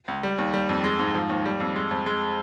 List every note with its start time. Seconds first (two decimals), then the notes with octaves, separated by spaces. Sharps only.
0.08 C#2
0.23 G3
0.38 D#2
0.54 G3
0.69 F2
0.84 G#3
0.99 G#2
1.14 F3
1.29 D#2
1.45 G3
1.60 F2
1.76 G#3
1.91 F2
2.06 G#3